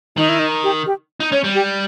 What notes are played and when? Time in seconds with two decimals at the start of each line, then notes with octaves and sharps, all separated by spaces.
0.17 D#3 D#4
0.29 E4
0.39 D#4
0.64 G4
0.86 G4
1.20 D#4
1.32 C#4 C#5
1.44 G3
1.55 G4